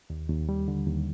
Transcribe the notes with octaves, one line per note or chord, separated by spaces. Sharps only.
D#2
D#2
G3
D3
D#2